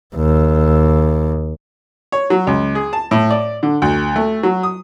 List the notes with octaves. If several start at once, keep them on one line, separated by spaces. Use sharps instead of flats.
D#2
C#5
F#3
C#2
G#4
A5
A2
D5
D3
D2
A3
F#3
D#6